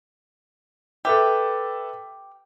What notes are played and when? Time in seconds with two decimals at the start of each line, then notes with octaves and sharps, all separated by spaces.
1.05 G4 A4 B4 E5